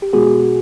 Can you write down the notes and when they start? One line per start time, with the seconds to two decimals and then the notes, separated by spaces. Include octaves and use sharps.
0.02 G4
0.13 B2 G#3 B3 F#4 G#4